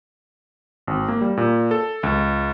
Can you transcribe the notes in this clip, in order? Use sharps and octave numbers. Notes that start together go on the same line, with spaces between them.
G#1
A#3
G3
A#2
A4
C#2